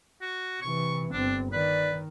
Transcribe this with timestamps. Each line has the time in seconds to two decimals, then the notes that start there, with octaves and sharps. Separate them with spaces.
0.21 F#4
0.62 C3 E3 C#6
1.12 G1 C4 D4
1.52 D#3 B4 D5